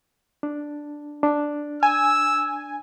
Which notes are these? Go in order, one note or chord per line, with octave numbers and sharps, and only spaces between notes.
D4
D4
G#5 E6